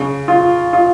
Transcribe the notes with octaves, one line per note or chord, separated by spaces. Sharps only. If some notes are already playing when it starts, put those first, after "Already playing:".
Already playing: C#3
F4
F4